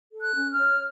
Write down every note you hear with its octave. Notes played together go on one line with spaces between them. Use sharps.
A4
F#6
C#4
F6
C#5